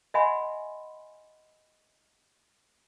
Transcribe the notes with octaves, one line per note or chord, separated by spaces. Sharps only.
D#5 E5 F#5 G#5 B5 C6